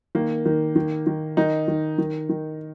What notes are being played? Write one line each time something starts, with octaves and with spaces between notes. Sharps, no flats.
D#3 A#3
D#3
D#3
D#3
D#3 D#4
D#3
D#3
D#3